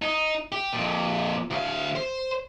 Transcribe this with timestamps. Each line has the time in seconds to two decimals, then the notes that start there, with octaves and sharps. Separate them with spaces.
0.02 D#4
0.52 G4
0.73 F2 A#2
1.51 D2 F5
1.95 C5